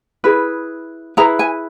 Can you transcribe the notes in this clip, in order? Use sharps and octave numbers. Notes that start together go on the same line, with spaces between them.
E4 G#4 B4
E4 G#4 B4 A#5
G#5